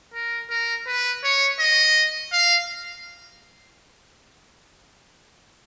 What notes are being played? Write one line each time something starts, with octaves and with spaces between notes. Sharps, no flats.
A#4
A#4
B4
C#5
D#5
F5